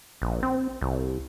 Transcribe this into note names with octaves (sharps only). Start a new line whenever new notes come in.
A#1
C4
C2